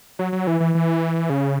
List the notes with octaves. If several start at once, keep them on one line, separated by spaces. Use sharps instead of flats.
F#3
F#3
E3
E3
E3
C#3